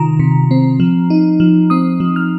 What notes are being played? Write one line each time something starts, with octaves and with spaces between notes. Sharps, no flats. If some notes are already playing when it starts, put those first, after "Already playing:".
Already playing: C3 D#3 F4 A#5
C3
C4
F3
D#4
F3
C4 D#6
F3
F6